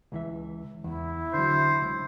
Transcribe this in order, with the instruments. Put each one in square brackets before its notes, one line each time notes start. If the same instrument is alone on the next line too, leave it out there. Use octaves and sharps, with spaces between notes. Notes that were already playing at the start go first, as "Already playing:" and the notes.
[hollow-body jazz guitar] C#2 E3 E5
[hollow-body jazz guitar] E2 [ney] E4
[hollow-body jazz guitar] D3 F#3 [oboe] C5
[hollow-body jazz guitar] C#2